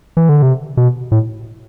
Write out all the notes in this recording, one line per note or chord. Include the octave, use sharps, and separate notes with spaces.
E3
D3
C3
B2
A2